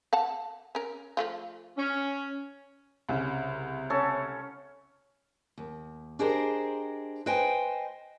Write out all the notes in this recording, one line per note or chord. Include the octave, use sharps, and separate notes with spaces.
F5 F#5 A5
C#4 A#4
F3 A3 F4
C#4
C2 C#3
C#4 A4
D#2
D4 G4 G#4 A#4 C5 D#5
B4 C5 D#5 G5 G#5